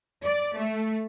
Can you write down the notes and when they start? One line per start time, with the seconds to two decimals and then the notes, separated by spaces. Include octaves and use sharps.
0.24 D5
0.58 A3